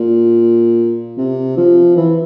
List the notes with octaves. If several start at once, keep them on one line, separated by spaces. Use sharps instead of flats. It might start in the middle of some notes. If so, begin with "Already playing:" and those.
Already playing: A#2
C3
F3
E3